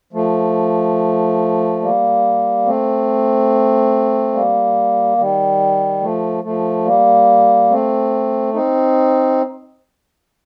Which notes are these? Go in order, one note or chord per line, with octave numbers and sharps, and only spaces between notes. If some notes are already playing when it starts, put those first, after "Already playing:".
F3 A3
G3 A#3
A3 C4
G3 A#3
D#3 G3
F3 A3
F3 A3
G3 A#3
A3 C4
C4 D#4